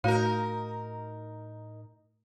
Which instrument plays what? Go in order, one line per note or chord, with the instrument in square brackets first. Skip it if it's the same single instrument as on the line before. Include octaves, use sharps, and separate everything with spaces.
[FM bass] A2 [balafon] A3 F#4 F5 [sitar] D#4 A#4